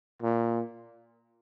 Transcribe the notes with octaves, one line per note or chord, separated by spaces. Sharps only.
A#2